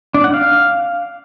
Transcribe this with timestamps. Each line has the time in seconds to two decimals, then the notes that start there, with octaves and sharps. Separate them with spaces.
0.14 D4
0.24 F#5
0.34 F5